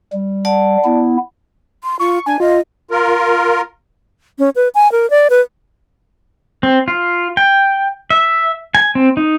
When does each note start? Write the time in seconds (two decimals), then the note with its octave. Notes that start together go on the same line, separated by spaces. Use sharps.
0.13 G3
0.45 D5 F#5 A5
0.84 B3 E4
1.83 C6
1.99 F4 C#6
2.26 D4 G#5
2.40 F4 D#5
2.91 F4 A#4
4.39 C#4
4.56 B4
4.75 G#5
4.92 A#4
5.10 D5
5.30 B4
6.63 C4
6.88 F4
7.37 G5
8.10 E5
8.75 G#5
8.95 C4
9.17 D#4